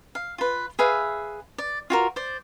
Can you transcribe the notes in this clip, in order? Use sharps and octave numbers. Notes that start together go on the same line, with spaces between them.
F5
F4 B4
G#4 B4 E5 F5
D5
F4 F#4 A#4
C5 D5